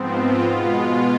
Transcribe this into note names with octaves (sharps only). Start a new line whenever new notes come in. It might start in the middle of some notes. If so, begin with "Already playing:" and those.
Already playing: G#2 F3 B3 C4
F4
B2 G#3 B3
F4